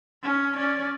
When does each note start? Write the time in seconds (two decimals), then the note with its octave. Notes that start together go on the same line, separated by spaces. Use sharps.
0.23 C#4
0.55 C#4 D5